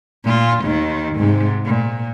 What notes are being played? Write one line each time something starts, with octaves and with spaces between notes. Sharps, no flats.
A#2 F4
D#2 D#3
G#2 C3
A#2